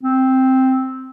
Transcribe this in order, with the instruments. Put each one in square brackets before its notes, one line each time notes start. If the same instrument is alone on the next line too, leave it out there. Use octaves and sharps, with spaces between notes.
[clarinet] C4